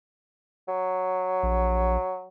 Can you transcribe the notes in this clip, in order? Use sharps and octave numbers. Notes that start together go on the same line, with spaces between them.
F#3
A#1